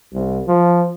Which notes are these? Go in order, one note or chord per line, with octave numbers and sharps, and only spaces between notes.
C2
F3